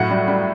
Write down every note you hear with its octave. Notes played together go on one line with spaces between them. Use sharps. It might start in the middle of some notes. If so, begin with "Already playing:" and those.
Already playing: A2 F#3 F#5
G3
G3